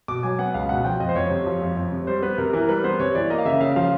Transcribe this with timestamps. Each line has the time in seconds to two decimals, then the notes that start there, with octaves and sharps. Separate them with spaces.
0.08 B2 D6
0.23 F#3 G#5
0.39 B3 F#5
0.54 C#2 F5
0.69 B2 F#5
0.85 F3 G5
1.00 F2 D#5
1.09 C5
1.16 F2 C#5
1.31 C3
1.46 F3
1.61 F2
1.77 F2
1.92 C3
2.07 G3 C5
2.23 B3 B4
2.38 C3 A#4
2.53 E3 A#4
2.68 G3 B4
2.84 B3 C5
2.99 C3 C#5
3.15 E3 D5
3.30 A#3 D#5
3.38 F5
3.45 C#3 E5
3.61 C#3 F5
3.76 F3 F5